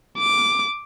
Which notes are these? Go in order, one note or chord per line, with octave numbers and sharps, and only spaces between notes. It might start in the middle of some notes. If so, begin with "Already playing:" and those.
D6